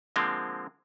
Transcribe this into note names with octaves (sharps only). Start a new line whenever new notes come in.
D3 F3 G#3 A#3 C4